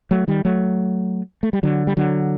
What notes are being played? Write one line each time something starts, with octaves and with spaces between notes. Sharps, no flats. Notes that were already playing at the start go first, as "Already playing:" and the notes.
F#3 A3
D#3 G3
F#3 A3
A3
G3
D3 F#3
G3
D3 F#3